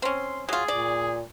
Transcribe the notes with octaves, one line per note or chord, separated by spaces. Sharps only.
C4 C#4 C6
F#3 F4 G#4
A#2 D5